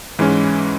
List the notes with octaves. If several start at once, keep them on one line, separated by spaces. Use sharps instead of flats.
G#2 E3 G#3 C#4